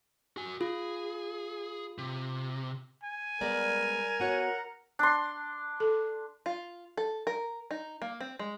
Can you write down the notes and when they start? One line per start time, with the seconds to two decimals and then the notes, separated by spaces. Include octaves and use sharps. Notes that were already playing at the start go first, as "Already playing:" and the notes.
0.37 F#4 G#5
0.61 F4 G#4
1.98 C3
3.03 G#5
3.41 G3 G#3 B3 A#4 D5
4.20 B3 F#4 C#5 F#5
4.99 D4 C6
5.80 A4
6.46 F4
6.97 A4
7.27 A#4
7.71 D#4
8.02 A#3
8.21 C4
8.39 G#3